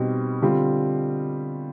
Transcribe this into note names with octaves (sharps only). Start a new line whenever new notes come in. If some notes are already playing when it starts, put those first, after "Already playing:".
Already playing: B2 G3 C4 D#4
D3 G3 C4 F4